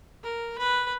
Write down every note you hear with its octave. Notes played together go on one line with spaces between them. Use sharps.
A#4
B4